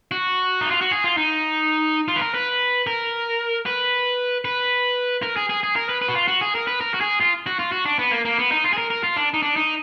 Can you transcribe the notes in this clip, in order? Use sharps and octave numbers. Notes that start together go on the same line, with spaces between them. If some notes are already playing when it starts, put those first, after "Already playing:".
F#4
D#4
F4
F#4
G#4
F4
D#4
F4
B4
A#4
B4
A#4
B4
B4
A#4
G#4
G#4
G#4
A#4
B4
B4
F#4
F4
F#4
G#4
A#4
B4
A#4
F#4
G#4
F4
F#4
F4
F#4
D4
B3
A#3
A#3
B3
D#4
F4
G#4
A#4
A#4
F4
D4
D#4
D4
D#4